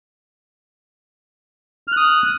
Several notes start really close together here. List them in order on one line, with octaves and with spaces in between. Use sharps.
F6 F#6 D#6